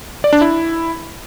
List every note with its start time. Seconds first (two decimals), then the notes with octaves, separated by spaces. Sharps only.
0.24 D5
0.33 D4
0.41 E4